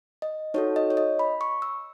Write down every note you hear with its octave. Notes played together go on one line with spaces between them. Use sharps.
D#5
D#4 F#4 A4 C#5
D#5
C#5
D#5
B5
C#6
E6